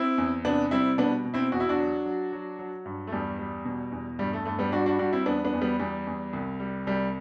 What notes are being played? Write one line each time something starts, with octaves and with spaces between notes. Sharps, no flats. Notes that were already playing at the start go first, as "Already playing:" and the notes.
Already playing: C4 E4
E2
C3 B3 D4
G3 C4 E4
B2 B3 D4
B2
C4 E4
E2 F#4
E4
D4 F#4
F#3
F#3
F#3
F#3
G2
A3
E2 G3
G3
B2
E2
G2 G3
A3
G2 A3
G3 B3
G3 D4 F#4
D4 F#4
G3 D4 F#4
C4 E4
E2 B3 D4
B3 D4
E2
G3 B3
E2 G3
E2
C2
G3
C2 G3